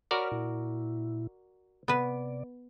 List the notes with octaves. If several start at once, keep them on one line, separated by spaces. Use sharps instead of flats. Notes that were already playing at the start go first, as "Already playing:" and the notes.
F#4 A#4 C#5 D5 B5 F6
A#2 E4
C3 B3 B4 D5